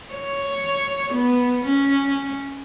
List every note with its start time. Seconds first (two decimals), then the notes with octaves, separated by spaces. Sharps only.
0.14 C#5
1.13 B3
1.66 C#4